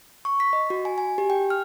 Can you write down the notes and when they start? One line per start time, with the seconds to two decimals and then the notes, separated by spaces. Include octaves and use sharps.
0.25 C#6
0.40 B6
0.53 D#5
0.70 F#4
0.85 G#5
0.98 G#5
1.18 G4
1.30 G5
1.50 F6